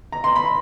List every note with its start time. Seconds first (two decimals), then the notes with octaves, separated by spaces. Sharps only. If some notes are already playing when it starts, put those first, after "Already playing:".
0.12 A#5
0.24 C6
0.36 B5